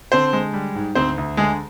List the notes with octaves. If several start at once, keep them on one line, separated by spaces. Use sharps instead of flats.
D3 C4 C5
G#3
G3
G#2
D2 C4 C5
D2
D3 G#3 G#4